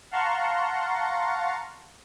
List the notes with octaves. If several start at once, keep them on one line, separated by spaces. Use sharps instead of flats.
F5 F#5 A5 A#5 C6 C#6